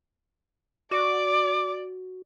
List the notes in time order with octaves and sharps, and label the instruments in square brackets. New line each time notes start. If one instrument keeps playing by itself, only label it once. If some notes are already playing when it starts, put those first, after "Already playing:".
[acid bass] F#4 [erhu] D5 [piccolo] D6